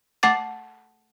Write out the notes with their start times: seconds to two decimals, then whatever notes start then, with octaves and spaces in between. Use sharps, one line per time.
0.23 A3 F#5 D6 A6